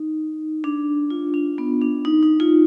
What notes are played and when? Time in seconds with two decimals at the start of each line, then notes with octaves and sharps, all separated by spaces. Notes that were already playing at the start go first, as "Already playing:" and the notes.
Already playing: D#4
0.64 D4
1.10 F4
1.34 D4
1.58 B3
1.81 D4
2.05 D#4
2.23 D#4
2.40 F4